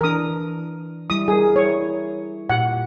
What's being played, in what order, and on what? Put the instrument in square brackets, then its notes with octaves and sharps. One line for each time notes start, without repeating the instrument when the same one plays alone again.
[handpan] E3 D4 [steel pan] A#4 D#6
[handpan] G3 E4 [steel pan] D#6
[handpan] G3 A#4 [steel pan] G#4
[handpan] E4 [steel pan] C#5
[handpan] A#2 G4 [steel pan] F#5